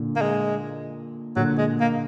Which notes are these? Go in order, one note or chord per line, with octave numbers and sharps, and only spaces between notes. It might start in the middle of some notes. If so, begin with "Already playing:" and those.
Already playing: A#2 D3
A#3
G#3
A#2 D3 F#3
G#3
A#3